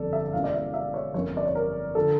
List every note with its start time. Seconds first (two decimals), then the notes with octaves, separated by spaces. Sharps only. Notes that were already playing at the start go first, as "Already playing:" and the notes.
Already playing: G1 F2 D3 A4 D5
0.13 E5
0.25 E5
0.33 E1 E2 E3 A#3 C#4 F5
0.44 D5
0.53 E5
0.74 E5
0.94 C#5
1.14 G1 F2 E3 A#3 C#4 C#5
1.37 D5
1.45 C#5
1.55 A#4
1.95 D3 F3 A4